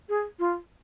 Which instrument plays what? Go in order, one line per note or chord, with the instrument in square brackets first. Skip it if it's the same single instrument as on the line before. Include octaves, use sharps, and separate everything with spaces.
[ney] G#4
F4